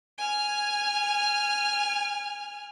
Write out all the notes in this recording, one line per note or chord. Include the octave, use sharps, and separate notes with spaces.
G#5 F6